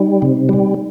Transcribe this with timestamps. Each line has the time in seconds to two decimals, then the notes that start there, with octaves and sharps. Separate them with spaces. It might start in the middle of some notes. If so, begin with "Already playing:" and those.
Already playing: G3 D#4
0.22 C3
0.49 G3